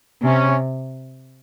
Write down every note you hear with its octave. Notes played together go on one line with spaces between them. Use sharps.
C3 C#4